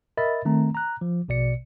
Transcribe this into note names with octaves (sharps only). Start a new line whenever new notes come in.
A#4 D#5 E5 B5 A6
D#3 A3 C4 A#5
A#5 F#6
F3
A#1 B2 D5 C#7